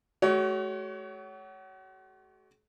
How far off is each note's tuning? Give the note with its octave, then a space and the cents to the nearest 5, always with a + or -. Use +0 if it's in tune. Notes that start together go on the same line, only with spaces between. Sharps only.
A3 -45 F#4 +35 C#5 +15